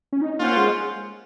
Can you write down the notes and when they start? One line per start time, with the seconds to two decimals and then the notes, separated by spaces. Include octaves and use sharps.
0.13 C#4
0.22 D#4
0.39 A#3 C#4 F4 C5 F#5
0.57 G#3